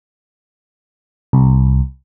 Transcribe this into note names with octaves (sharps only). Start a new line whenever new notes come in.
C2